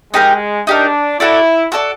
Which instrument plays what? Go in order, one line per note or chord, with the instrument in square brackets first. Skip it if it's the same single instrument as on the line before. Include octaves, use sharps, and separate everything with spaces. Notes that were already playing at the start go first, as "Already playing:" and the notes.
[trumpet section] G#3 [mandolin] D#4 G4 A#4
[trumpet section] D4 [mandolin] D#4 G4 A#4
[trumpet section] E4 [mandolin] F#4 A4 D5
[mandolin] F#4 A4 D5